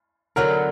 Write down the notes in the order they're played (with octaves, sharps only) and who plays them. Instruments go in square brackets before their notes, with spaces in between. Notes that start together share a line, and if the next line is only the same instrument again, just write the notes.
[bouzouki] D3 F#3 B3 [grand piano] A#4